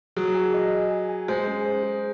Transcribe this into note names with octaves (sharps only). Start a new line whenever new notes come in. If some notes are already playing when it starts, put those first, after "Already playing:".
F#3 G#4
G#5
D#5
G#4
G#5
G#5
G#3 C5
C#4
C5
G#4